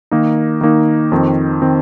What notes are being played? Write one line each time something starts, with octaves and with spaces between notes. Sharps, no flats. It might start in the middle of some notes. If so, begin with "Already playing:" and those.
D#3 A#3 D#4
D#3 A#3 D#4
F2 D#3 C4
D#3 C4